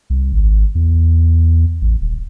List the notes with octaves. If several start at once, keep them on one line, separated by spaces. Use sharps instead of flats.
C2
G#1
E2
A1
D#1